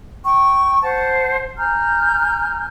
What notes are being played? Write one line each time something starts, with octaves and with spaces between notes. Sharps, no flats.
G5 C#6
C5 F#5 A5
G#5 A#5 F6 G6